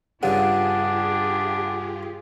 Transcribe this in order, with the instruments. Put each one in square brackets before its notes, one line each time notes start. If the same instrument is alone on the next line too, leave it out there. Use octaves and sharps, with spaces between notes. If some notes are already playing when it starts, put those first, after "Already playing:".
[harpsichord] G2 C#3 [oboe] D4 [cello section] F4 G4 G#4 [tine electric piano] F#5